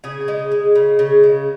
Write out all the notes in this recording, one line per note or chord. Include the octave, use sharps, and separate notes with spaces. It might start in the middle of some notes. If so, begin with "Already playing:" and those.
C#3 G#4
G#3
G#3
C#3
C#3
G#3